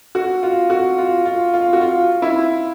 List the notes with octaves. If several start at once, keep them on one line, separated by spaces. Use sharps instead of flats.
F#4
F4
F#4
F4
F4
F4
F#4
F4
E4